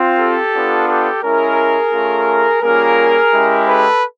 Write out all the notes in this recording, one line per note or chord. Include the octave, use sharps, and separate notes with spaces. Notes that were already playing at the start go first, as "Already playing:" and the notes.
Already playing: C4 F4
G4 A4
B3 D4 F4
G4 A4
G#3 C#4 E4 G#4 A#4
A3 C#4 F4
G3 A#3 C#4 F4 G#4 A#4
G#3 C#4 E4 G4
A4 B4